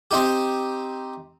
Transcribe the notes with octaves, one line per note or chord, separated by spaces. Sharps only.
C4 D#4 G4